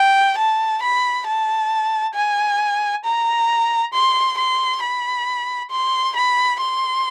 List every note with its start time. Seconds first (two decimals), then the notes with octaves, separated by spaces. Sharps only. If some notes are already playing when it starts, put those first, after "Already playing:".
Already playing: G5
0.38 A5
0.83 B5
1.27 A5
2.16 G#5
3.05 A#5
3.94 C6
4.38 C6
4.83 B5
5.71 C6
6.16 B5
6.60 C6